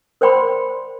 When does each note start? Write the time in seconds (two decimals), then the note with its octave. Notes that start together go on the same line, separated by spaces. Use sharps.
0.21 A#4 C5 D5 G5 B5 C6